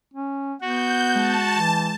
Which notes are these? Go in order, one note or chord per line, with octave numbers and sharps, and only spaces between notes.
C#4
B3 F#4 G6
G#3 A5
E3